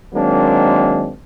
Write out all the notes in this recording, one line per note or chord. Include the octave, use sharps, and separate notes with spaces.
D#3 F#3 G#3 A#3 C4 D4